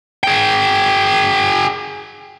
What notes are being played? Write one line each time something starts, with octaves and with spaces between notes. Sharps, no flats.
G#4 G5